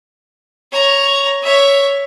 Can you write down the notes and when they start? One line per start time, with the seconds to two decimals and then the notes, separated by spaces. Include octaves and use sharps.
0.72 C#5 A#5
1.42 C#5 E5